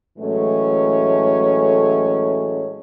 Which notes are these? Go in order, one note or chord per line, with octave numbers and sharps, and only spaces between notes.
A2 E3 F#3 G#3 A3 C#4